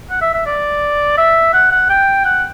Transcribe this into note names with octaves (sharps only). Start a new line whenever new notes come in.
F#5
E5
E5
D5
E5
F#5
F#5
G5
F#5